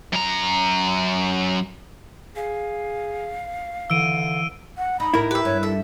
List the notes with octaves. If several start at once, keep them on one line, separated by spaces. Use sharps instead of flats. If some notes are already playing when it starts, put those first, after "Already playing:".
F#2 A#5
G#4 F5
D3 E3 E6 D7 D#7
F#5
D#4 B5
A2 D#4 E4 A#4
G4 B4 E5
G2 C#5
A4 E5